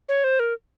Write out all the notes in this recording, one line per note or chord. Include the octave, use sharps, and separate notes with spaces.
C#5
C5
A#4